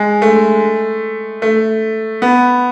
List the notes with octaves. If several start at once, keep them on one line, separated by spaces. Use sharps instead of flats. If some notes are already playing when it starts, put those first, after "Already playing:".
Already playing: G#3
A3
A3
B3